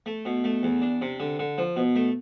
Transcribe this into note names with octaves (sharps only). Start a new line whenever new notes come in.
A3
B2
A3
E2
D4
C3
D3
D3
F3
B2
A3